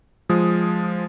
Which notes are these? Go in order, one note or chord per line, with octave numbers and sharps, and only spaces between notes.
F3 G#3 D#6